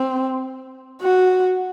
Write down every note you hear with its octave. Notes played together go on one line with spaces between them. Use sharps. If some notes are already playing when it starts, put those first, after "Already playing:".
Already playing: C4
F#4